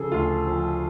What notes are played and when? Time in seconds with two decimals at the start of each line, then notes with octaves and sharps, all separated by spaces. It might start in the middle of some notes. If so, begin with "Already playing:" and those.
Already playing: C#3 F3 G#4 A4
0.12 D2 F4
0.47 F3